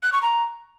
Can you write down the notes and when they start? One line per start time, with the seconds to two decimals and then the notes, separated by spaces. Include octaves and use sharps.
0.03 F#6
0.13 C#6
0.22 A#5